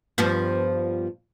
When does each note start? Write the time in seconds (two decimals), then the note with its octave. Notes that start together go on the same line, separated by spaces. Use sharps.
0.18 G2 F3 B3